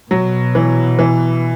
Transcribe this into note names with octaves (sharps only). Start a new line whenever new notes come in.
B2 F#3
E3
E3